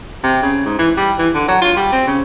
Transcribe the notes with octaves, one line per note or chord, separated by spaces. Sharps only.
C3
C#3
G#2
E3
G3
E3
D3
F#3
F4
G3
C4
C#3